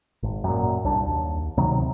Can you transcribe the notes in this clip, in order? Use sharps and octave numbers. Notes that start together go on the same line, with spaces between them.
G#1
F#2 A#2
C2 D4
D#2
D2 C3 D#3 F#3